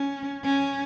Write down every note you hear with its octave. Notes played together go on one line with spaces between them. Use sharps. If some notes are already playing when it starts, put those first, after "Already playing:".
Already playing: C#4
C#4